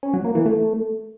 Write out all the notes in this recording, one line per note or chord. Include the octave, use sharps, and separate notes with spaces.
C#4
F#3
A#3
E3
A3